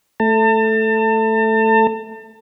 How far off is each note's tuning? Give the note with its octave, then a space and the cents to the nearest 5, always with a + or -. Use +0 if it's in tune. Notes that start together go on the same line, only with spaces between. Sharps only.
A3 +0 A5 +35